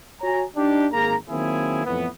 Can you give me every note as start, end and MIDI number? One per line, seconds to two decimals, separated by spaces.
0.21 0.43 66
0.21 0.43 73
0.21 0.43 80
0.21 0.43 82
0.56 0.86 62
0.56 0.86 63
0.56 0.86 67
0.93 1.15 32
0.93 1.15 58
0.93 1.15 68
0.93 1.15 82
1.28 1.85 51
1.28 1.85 54
1.28 1.85 58
1.28 1.85 60
1.28 1.85 64
1.28 1.85 68
1.86 2.07 41
1.86 2.07 45
1.86 2.07 52
1.86 2.07 59